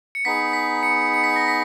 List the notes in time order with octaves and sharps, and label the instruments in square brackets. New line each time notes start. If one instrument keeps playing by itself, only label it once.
[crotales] C#7
[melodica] B3 D#4 G#4 [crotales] B6
[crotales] B6
C#7
C#7
B6
A#6
B6